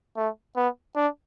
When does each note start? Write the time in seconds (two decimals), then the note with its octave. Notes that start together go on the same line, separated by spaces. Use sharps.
0.17 A3
0.56 B3
0.96 D4